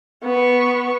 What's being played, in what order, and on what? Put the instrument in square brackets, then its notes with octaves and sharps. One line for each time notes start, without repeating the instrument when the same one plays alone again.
[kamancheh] B3 C#6